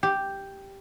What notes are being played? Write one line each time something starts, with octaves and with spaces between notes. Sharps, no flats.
G4